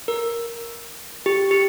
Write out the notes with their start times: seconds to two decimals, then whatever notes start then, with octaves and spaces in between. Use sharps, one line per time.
0.08 A#4
1.26 G4
1.51 G4